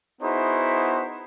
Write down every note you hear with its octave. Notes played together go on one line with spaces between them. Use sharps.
B3 D#4 E4 F#4 G#4 C5